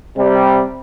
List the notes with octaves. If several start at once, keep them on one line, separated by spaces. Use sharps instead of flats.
C3 G3